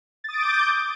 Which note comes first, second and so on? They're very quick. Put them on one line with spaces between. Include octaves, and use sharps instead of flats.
A6 D#6 D7 D6 G6